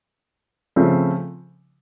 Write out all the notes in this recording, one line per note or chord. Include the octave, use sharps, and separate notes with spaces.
C#3 F3 A3 C4